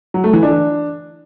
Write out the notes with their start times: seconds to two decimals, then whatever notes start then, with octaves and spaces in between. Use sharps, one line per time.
0.14 F#3
0.24 A3
0.33 E3
0.43 D4